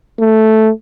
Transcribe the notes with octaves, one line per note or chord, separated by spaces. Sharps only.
A3